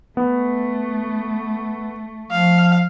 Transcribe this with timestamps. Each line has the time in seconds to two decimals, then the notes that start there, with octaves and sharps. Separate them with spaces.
0.17 A3 B3
2.31 F3 F5